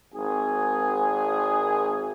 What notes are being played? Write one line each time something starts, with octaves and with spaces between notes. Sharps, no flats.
G#1 G#4